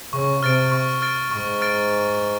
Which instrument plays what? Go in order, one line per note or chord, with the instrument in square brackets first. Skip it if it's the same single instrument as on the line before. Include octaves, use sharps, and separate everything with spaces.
[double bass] C#3 [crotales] C#6
[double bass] C3 [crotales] F6 A6 D7
[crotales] C#6
F6 A6 D7
[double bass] G#2 [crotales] C#6
[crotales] F6 A6 D7